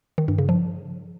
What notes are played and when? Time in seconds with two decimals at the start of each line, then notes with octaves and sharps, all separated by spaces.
0.18 D#3
0.28 G2
0.38 C#3
0.49 F3